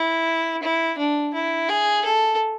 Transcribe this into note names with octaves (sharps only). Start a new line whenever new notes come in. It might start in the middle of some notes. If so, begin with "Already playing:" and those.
Already playing: E4
E4
D4
E4
G#4
A4